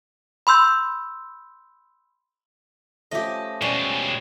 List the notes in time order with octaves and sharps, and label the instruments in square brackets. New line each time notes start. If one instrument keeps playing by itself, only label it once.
[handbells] B5 C6 E6 G6
[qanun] F3 A3 C#4 [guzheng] G4 D#5
[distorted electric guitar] B2 G#3 [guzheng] G3 C#4 [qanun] B4